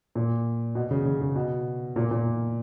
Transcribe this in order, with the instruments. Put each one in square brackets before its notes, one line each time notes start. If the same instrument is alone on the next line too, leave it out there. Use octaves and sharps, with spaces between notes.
[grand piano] A#2
B2
C#3
C#3
C#3
B2
A#2
A#2